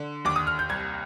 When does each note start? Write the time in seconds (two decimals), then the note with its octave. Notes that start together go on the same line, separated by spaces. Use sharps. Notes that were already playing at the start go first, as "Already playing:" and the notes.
Already playing: D3
0.25 D#2 D6
0.36 D#6
0.47 F6
0.59 G6
0.69 C2 G#6